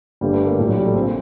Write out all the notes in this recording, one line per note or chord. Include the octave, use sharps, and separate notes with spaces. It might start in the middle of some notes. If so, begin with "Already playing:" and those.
G1 G2 D3 G3
A3
A#3
A#1 A2 G3
F#3
G3
A3
A#1 A#2 C4